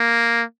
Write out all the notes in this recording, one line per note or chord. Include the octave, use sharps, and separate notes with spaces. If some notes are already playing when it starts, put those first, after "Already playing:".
Already playing: A#3